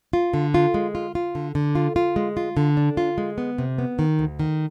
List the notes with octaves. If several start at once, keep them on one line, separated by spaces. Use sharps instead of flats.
F4
D3
F4
G#3
F4
F4
D3
D3
F4
F4
G#3
F4
D3
D4
F4
G#3
B3
C3
B3
D#3
D2
D#3